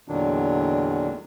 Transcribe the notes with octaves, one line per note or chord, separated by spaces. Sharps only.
E2 A#2 D3 D#3 F#3 D4